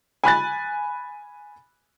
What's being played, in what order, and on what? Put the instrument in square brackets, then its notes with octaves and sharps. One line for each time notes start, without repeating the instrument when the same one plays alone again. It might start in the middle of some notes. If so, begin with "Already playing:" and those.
[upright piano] G#5 B5 F#6 A6